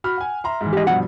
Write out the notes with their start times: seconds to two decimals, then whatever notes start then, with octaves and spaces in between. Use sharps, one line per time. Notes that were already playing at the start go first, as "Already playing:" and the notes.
0.04 F#4 B5 F6
0.18 F#5 G#5
0.44 E5 A#5 C6
0.61 G#2 E3
0.73 G4 D#5
0.87 G2 B2 F3 F#5